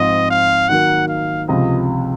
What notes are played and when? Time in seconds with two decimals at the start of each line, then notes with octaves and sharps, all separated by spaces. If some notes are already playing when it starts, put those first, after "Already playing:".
Already playing: G#2 F3 G#3 C4 F4 D#5
0.31 F5
0.69 D#3 F#3 A#3 F#5
1.08 F5
1.48 C#2 C3 F3 D#5